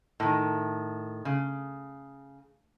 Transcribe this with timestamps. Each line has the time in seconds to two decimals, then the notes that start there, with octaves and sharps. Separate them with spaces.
0.20 A2 D#3
1.25 C#3